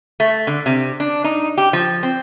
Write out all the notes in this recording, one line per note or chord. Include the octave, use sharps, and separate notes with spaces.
A3
D3
C3
D4
D#4
G4
F3
C4